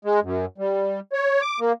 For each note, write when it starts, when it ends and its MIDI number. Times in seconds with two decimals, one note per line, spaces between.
0.05 0.20 56
0.23 0.45 42
0.58 1.00 55
1.13 1.41 73
1.41 1.60 86
1.60 1.72 58